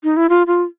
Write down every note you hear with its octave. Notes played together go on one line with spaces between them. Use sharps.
D#4
E4
F4
F4